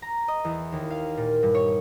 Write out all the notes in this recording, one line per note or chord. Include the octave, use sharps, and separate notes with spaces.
A#5
D#5
E2
D#2
F5
A#2
G2
C#5